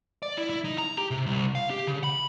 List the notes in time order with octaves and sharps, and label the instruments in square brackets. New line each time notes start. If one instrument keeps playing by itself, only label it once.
[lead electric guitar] D5
E4
E4
D#4
A#5
G4
C3
C2
F5
G4
C#3
B5